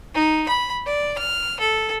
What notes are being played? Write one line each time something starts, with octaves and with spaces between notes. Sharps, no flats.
D#4
B5
D5
F6
A4